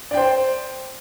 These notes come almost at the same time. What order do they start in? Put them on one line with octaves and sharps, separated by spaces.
D5 G5 C5